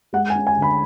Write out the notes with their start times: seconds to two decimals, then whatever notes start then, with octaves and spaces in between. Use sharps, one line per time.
0.13 G#3 F#5
0.30 G#5
0.35 C#4
0.47 G#5
0.57 D2
0.62 B5